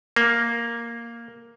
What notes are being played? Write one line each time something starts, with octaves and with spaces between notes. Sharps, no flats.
A#3